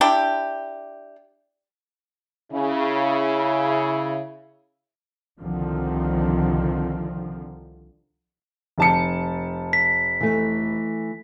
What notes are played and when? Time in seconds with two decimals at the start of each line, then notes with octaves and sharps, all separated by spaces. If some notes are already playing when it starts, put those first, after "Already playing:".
0.01 D4 E4 G4
2.52 C#3 E4
5.39 C2 D3 D#3 F3 C4
8.78 F1 A5 C#7
9.73 B6
10.21 E3 A3